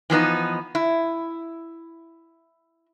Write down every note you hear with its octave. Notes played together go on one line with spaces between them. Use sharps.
E3 F3 B3 D#4
E4